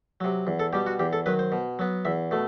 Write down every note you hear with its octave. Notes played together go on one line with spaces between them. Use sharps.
C3 F#3
E2
A4
B2 G3 G4
F#4
E2 G4
A4
D#3 F#3 B4
C5
B2
F#3 B3
E2 E5
B2 A3